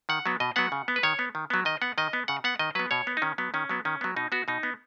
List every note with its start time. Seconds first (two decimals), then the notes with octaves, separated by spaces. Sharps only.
0.09 D#3 F#5
0.26 F#3 B3
0.40 B2 D#5
0.56 F#3 B3 F#5
0.72 C#3
0.88 B3
0.96 B4
1.03 D#3 C#5
1.19 B3
1.35 D#3
1.50 F#3 B3
1.65 D#3 D#5
1.82 B3 F#5
1.98 D#3 D#5
2.13 B3
2.28 C#3 F#5
2.44 B3 F#5
2.59 D#3 D#5
2.75 F#3 B3 B4
2.91 B2 C#5
3.07 B3
3.17 D#4
3.22 D#3 C#4
3.38 F#3 B3
3.54 D#3 C#4
3.69 F#3 B3
3.85 D#3 C#4
4.01 F#3 B3
4.16 B2 D#4
4.32 B3 F#4
4.48 B2 D#4
4.63 B3